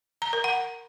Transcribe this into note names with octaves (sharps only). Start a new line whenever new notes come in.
A#5
A#4
F#5